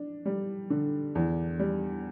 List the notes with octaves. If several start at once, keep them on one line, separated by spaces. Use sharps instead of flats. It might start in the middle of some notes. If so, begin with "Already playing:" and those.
Already playing: D4
G3
D3
E2
G3